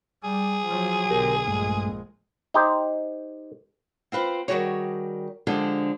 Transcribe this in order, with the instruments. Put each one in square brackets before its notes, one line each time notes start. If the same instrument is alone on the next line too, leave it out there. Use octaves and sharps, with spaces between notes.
[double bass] G3 [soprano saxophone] G#4
[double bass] F3 F#3
[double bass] B1 D3 [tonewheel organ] G4 A#4
[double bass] A#1 G#3 [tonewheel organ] G2 A3
[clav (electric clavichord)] D#4 G4 C5
[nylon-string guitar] C4 F4 B4 C5
D#3 F#3 G3 F#4 G#4 C#5
D3 F3 G#3 D4 G4 A4